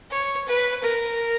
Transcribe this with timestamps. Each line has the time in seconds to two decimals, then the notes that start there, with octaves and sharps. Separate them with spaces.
0.11 C#5
0.48 B4
0.83 A#4